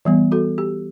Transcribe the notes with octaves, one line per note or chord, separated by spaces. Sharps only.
E3 G3 B3
F#4 A4
G4